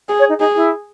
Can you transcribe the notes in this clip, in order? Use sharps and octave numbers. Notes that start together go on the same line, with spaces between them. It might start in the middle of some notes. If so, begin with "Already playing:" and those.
G#4
C#5
D#4
D#4 G#4
E4